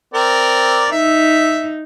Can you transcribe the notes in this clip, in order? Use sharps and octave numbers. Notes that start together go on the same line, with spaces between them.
C4 A#4 D5
D#4 E5